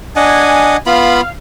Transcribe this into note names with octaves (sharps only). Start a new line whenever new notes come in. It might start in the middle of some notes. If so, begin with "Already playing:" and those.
D4 D#5 F#5 G#5
B3 F4 F5 B5